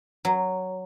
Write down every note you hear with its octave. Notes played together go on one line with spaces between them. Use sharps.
F#3